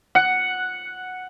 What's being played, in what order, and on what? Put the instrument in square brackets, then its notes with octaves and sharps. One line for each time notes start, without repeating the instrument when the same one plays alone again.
[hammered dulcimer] F#5